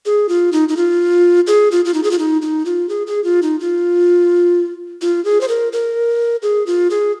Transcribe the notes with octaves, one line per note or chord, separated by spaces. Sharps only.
G#4
F4
D#4
D#4
F4
G#4
F4
F4
D#4
G#4
F4
D#4
D#4
F4
G#4
G#4
F4
D#4
F4
F4
G#4
C5
A#4
A#4
G#4
F4
G#4